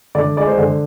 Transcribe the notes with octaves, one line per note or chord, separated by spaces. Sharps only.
D3 D5
G#3 D5
C5
D3